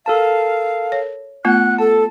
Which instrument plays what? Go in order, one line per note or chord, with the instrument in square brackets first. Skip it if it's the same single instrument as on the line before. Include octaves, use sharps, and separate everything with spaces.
[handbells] A4 A#4 A5 [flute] F5
[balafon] C#5
[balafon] A3 B3 F4 [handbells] F#5 [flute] F#6
[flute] A4 [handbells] A5